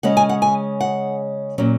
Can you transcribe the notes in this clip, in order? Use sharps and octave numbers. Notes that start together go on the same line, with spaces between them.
C#3 G#3 C#4 F#5
G#5
F#5
G#5
F#5
A#2 F#3 C#4